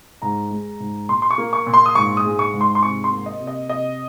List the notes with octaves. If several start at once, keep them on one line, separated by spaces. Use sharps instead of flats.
G#2 A#5
G#3
G#2
A#2 C6
C6
C#6
A#3
C#6
A#2
C6
D#6
G#2 C#6
D#6
G#3
C#6
G#2
C6
C6
C3 C#6
C6
A#3
D#5
C3
D#5
C3 D#5